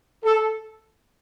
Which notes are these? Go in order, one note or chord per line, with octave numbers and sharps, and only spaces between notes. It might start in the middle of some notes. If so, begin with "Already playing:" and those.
A4